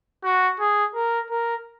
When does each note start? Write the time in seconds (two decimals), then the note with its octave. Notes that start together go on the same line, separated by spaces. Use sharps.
0.24 F#4
0.60 G#4
0.95 A#4
1.30 A#4